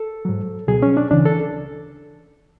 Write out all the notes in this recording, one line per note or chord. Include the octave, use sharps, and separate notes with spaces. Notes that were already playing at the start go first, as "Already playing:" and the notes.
Already playing: A4
G#2 F#3
C#2 B2 F#3 G#4
C#4
D4
C#2 C#3 E3 D4
A4